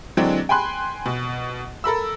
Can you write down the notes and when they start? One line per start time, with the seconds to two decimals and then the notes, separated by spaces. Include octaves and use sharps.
0.17 D3 E3 F#3 G#3 C4 D4
0.49 G5 G#5 B5 C6 F#6
1.06 B2
1.84 A4 A#4 B5 E6